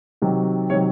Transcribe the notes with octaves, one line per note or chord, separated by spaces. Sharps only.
C3 D#3 F#3
C3 D#3 F#3 C#5